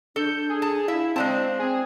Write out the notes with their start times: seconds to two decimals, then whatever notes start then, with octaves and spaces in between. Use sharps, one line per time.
0.16 D4 A4 G6
0.50 G#4
0.62 A5
0.88 E4 E5 F5
1.16 G#3 C4 D4 A5
1.59 C4 G#4